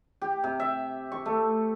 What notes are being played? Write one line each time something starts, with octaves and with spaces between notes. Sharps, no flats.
G4
C3
E5
C#6
A3